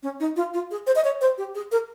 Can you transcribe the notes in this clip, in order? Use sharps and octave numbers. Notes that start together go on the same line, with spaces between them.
C#4
D#4
F4
F4
G#4
C5
D#5
C#5
C5
G4
G#4
A#4